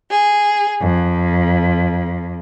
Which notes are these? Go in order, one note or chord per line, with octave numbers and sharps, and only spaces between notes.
G#4
F2